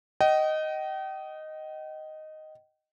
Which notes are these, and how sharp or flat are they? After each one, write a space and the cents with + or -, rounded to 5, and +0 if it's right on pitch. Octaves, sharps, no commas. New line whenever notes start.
D#5 +0 G5 -40